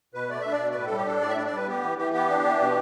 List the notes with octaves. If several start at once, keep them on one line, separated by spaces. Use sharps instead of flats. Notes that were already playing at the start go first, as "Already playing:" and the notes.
B2 B4
A3 D5
D4 E5
D5
B2
D5
A2 B4
A4
G3
G4
D4 A4
A2 D5
E5
D4 D5
D5
G3 B4
B3 G4
E3
E3 G4
B3 G4
D4
E3
B2